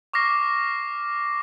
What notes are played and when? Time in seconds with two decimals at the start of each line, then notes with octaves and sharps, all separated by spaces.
0.13 C#6 D6 F6 A#6 C7